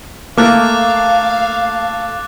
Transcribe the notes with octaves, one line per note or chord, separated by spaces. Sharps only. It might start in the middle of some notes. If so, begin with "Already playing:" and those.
A3 A#3 A4 F5 D6 F#6 A6